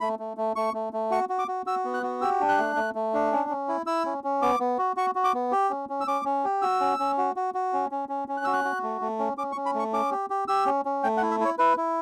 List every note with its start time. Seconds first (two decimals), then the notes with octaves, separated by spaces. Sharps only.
0.01 A3 B5
0.19 A3
0.37 A3
0.56 A3 C#6
0.74 A3
0.93 A3
1.11 F#4 C#6
1.29 F#4
1.39 D6
1.48 F#4
1.66 F#4 E6
1.85 B3
1.94 F#6
2.03 F#4
2.21 G4 E6
2.40 D4
2.48 F#6
2.58 A3
2.76 A3
2.95 A3
3.14 D4
3.32 C#4
3.50 C#4
3.68 E4
3.86 E4 E6
4.06 C#4
4.24 C#4
4.42 B3 D6
4.60 B3
4.78 F#4
4.97 F#4 C#6
5.15 F#4
5.24 D6
5.34 B3
5.52 G4
5.70 C#4
5.89 C#4
6.01 E6
6.07 C#4 D6
6.25 C#4
6.45 G4
6.62 F#4 E6
6.80 C#4
6.99 C#4
7.18 F#4
7.36 F#4
7.54 F#4
7.73 C#4
7.91 C#4
8.09 C#4
8.28 C#4
8.37 F#6
8.44 F#4 E6
8.53 F#6
8.64 F#4
8.83 A3
9.01 A3
9.19 C#4
9.37 C#4 D6
9.52 C#6
9.56 C#4
9.66 B5
9.74 A3 C#6
9.93 C#4 D6
10.11 G4
10.30 G4
10.48 G4 E6
10.66 C#4
10.85 C#4
11.03 A3 G5
11.17 F#5
11.22 E4
11.31 E5
11.40 E4 C#5
11.58 E4 B4
11.77 E4